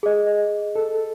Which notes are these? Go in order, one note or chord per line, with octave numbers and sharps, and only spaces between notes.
G#4 D#5
A4